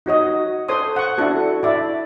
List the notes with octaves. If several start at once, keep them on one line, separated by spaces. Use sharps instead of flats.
D#4 F#4 C#5 D#5
A4 C5 C#5 C6 D#6
F#5 C#6
D4 E4 F#4 A4
E4 D5 E5